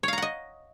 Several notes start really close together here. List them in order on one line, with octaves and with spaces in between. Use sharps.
C#5 F5 A#5 F#5 D#5